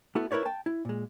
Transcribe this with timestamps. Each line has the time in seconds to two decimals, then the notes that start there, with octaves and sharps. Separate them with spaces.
0.15 A3 B3 E4 F#4 A4
0.31 E4 A#4 B4 C#5 D5
0.45 G5 A5
0.66 E4
0.85 A#2 G#3